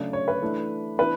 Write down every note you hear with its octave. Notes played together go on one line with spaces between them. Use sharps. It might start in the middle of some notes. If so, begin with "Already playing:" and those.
Already playing: C#3 F#3 A3 D4 D5
C#5
B4
E3 A3 D4
E3 B3 D4 B4